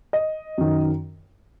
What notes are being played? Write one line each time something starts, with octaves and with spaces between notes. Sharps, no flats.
D#5
F#2 D#3